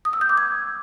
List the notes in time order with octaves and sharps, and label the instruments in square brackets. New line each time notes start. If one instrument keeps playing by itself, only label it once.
[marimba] D#6
E6
G6
D6
G#6